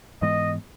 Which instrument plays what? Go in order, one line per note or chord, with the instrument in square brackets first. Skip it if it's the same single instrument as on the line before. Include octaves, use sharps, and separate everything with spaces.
[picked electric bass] G#2 E3 G#3 B3 [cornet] D#5